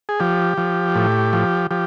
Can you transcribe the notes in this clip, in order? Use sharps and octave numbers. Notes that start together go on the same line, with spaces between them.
G#4
F3 G4
F3
A2
F3
F3 G4